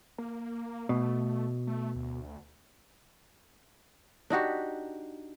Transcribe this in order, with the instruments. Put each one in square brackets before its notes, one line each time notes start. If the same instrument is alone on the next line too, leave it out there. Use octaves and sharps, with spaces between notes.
[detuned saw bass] A#3
[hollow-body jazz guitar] B2 [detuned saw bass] A3
[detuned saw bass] A3
D2
[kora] D4 D#4 F#4 G4